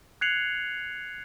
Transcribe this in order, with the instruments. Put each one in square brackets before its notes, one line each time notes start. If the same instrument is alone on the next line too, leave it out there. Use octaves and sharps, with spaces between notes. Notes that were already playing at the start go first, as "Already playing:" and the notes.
[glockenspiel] F#6 G#6 C7 C#7 F7 F#7